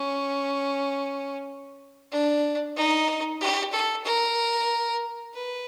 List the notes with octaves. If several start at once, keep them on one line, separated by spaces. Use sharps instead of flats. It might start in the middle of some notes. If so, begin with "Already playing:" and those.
Already playing: C#4
D4
D#4
G4
A4
A#4
B4